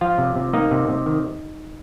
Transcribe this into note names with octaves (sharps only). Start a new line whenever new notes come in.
F3 F4 F5
C3
C3
A#3 D#4 D#5
C3
C3
D#3